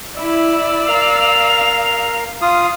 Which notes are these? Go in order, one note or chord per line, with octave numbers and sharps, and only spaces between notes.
E4 D5 E6
A#4 F5 F7
F4 F5 D#6